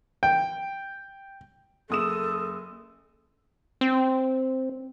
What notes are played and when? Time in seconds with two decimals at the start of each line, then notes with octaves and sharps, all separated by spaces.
0.23 G5
1.90 F#1 A4 D#6 E7
3.81 C4